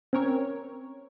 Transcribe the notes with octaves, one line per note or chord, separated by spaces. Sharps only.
C4 C#4 A#4 C#5